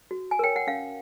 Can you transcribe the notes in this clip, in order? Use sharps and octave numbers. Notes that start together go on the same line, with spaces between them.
F#4
G#5
A#4 C#5 G5
F#5
C#4 F5